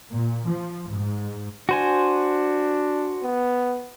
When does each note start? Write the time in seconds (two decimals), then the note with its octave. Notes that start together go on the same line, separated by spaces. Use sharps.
0.11 A#2
0.45 F3
0.88 G#2
1.69 D4 F#4 C5 G#5
3.23 B3